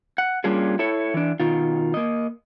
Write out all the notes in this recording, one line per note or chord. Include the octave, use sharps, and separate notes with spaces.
F#5
G3 A#3 C#4 D4 F4 G#4
E4 A4 C#5
E3 D4
B2 D#3 F4
A#3 D#5